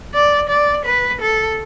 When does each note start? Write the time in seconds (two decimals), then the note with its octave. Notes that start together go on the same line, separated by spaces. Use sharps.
0.14 D5
0.49 D5
0.86 B4
1.21 A4